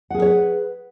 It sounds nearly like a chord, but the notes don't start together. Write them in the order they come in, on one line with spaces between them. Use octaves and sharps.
F#5 G#4 A#4 C#5 B4